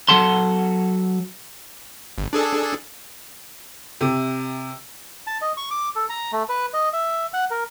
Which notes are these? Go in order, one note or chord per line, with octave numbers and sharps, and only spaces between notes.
F#3 A4 F#5 A5 C6
G1
D4 G#4 A4
C3
A5
D#5
C#6
D6
A4
A#5
A3
B4
D#5
E5
F#5
A#4